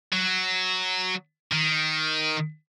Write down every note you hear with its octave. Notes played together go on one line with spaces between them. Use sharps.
F#3
D#3